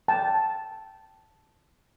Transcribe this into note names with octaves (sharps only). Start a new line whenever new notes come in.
G5 A5